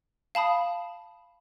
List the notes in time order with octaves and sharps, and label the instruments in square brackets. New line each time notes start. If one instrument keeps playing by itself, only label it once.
[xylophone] F5 A5 B5 D#6